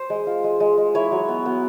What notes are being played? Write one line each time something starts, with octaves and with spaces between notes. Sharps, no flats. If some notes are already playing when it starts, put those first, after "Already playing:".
Already playing: C5
G#3
F4
G#3
G#3
G#3
E4 C#5
F#3
B3
B3